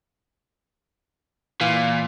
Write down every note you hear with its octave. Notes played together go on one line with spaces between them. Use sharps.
A#2 E3 F5